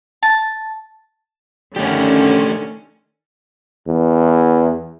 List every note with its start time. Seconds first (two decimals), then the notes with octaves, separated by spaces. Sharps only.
0.23 A5
1.76 D3 D#3 A3 C#4 G4
3.87 E2